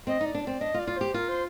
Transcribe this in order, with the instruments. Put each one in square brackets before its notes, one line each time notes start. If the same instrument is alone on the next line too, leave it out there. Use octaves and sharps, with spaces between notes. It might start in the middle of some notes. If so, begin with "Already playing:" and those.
[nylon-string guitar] C4 [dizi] D#5
[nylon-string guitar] D#4
[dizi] D5
[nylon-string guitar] D4
[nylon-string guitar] C4 [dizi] D5
[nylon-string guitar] D4 [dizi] D#5
[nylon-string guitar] F4
[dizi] D5
[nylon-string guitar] F4
[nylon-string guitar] G4 [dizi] C5
[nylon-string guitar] F4 [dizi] A#4
[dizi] C5